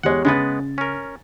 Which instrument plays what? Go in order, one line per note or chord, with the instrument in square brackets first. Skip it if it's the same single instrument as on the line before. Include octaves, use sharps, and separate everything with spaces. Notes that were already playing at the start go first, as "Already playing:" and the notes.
[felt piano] E2 G4 C#5 [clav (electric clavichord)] G#3 F#5
[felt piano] C#3 A6 [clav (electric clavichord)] G#3 B3 B4
[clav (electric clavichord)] C#4 A#4